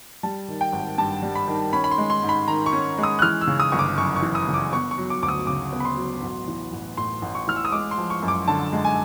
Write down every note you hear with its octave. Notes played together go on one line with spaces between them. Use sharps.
G3 A5
D#3
G5
G#1
G2 A5
G3
B5
D#3
C#4 B5
B5
C6
G#3
C6
G#2
B5
D#3 A#5
C#6
C#4
G#3
D#6
F#6
E3 F6
E6
C#3
D#6
G1 C#6
D6
F#2 C#6
C#6
E3
D#6
C#3
D6
B3 C#6
C#6
F#3
D6
D2 D6
D#6
C#3 D6
B3
B5
C6
F#3
A1
E3
A1
A2 C6
A1
C#6
E3 F6
E6
D#6
G#3 D6
C6
F3
C#6
F#2
D6
D3 A5
G#3
G#5